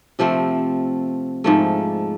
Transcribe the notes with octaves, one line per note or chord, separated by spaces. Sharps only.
C3 F3 A3 C4
G#2 F3 A3